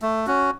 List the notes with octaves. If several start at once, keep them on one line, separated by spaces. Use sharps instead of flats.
A3
C#4 F#4